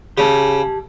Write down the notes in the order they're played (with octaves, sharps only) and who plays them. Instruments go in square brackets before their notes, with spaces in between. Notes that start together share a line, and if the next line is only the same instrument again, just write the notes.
[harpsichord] C#3 [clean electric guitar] G4 A5